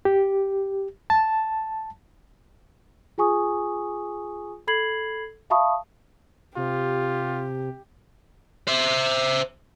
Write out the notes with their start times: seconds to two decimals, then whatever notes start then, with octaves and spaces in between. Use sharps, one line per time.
0.05 G4
1.10 A5
3.18 F4 G#4 G#5 C#6 D#6
4.67 A4 B5 G#6 C7 F#7
5.50 E5 F5 A5 B5 C#6 D#6
6.57 C3 F4 G4
8.68 C5 E5